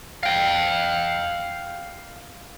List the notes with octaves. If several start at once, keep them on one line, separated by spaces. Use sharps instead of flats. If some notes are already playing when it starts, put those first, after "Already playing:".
F5 G5